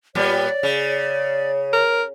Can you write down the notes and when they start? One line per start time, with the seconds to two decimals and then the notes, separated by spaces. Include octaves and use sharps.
0.15 A#2 G3 B3 C#5 D5
0.63 C#3
1.73 A#4